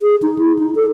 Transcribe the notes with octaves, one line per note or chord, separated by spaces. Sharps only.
G#4
D#4
E4
D#4
A4